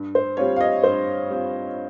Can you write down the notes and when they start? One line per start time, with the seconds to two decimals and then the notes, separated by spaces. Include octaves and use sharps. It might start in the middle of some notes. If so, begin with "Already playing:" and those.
Already playing: G2
0.15 C5
0.37 G3 C4 F4 C#5
0.56 F5
0.61 D#5
0.83 G2 C5
1.30 G3 C4 F4